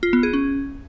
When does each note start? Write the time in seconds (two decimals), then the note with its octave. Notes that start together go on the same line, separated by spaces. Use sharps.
0.03 F4
0.13 B3
0.23 G#4
0.33 C#4